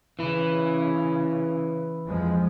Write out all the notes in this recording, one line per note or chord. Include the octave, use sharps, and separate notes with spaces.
C#3 E3 E4
F2 F3 G#3